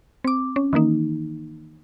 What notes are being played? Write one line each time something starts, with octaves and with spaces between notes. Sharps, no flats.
C4 D6
C#4
D#3 E3 A#3 D#4